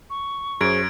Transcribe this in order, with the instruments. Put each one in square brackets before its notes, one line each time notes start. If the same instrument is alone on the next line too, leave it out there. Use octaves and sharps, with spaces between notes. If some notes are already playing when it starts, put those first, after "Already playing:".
[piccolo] C#6
[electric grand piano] F#2 [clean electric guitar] G#4 C5 [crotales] G#6 D7